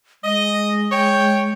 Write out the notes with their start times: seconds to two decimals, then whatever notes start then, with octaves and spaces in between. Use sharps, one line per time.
0.24 G#3 D#5
0.91 C#5 G5